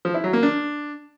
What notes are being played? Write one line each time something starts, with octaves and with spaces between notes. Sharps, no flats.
F3
E4
F#3
A#3
D4